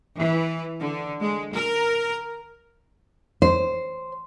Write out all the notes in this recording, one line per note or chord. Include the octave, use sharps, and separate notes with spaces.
E3
D3
G#3
A#4
C5